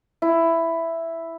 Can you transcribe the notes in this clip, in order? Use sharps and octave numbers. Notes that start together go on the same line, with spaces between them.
E4